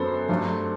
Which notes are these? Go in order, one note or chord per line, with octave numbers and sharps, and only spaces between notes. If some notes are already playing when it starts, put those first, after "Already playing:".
Already playing: F#2 F#3 B3 A4 C5
G2 F#3 A3